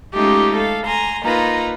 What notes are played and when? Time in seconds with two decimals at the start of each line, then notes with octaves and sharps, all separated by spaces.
0.13 G#3 A3 C#4 D#4 F4 G4
0.56 A4 F5
0.86 G#5 A#5 C6
1.22 A#3 D#4 F4 B4 A#5